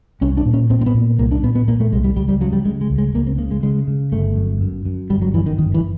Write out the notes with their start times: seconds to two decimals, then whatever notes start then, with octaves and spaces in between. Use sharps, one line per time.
0.21 C2 C#4
0.37 D4
0.46 A#2
0.54 C#4
0.70 A#2 C4
0.81 C4
0.86 B3
0.94 A#2
1.18 C2 A#3
1.31 D4
1.43 A#2 B3
1.55 B3
1.68 A#2 A#3
1.80 A3
1.93 C2 G#3
2.04 G3
2.17 C#2 G3
2.29 G3
2.41 C#3 F#3
2.53 G3
2.65 C#3 G#3
2.81 G#3
2.90 C#2
2.98 G#3
3.15 C#2 A#3
3.27 C4
3.38 C#3 A#3
3.51 G#3
3.63 C#3 G#3
3.87 C#3
4.12 G1 A3
4.36 F#2
4.61 F#2
4.85 F#2
5.10 G1 G3
5.22 F#3
5.34 F#2 E3
5.46 D#3
5.58 G1 D#3
5.74 E3